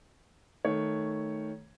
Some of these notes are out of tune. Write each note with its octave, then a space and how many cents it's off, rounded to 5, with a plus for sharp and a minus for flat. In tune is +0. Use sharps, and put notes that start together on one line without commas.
D#3 +10 A3 +0 C#5 +0